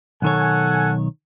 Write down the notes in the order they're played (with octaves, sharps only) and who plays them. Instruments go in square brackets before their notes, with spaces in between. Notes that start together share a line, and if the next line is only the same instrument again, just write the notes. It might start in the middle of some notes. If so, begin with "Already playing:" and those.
[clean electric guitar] B1 D#3 C#5 [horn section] A4 F#5 G#5